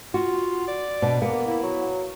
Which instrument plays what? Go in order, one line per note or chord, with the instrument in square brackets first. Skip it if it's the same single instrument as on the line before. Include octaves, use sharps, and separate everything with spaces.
[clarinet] F4 [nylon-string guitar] F#4
[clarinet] D5
[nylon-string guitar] B2 [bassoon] D4
[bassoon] A#3 [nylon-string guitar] B3
[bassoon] A#3 [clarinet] E4
[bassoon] F#3